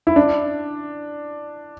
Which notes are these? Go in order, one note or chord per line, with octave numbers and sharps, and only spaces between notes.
E4
D4